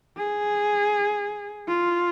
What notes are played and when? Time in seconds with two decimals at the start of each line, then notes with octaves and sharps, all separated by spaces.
0.17 G#4
1.68 F4